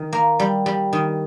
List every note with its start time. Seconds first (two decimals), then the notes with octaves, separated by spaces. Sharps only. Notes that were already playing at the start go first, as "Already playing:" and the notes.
Already playing: D#3
0.13 A#3
0.40 G3
0.66 G3
0.93 D#3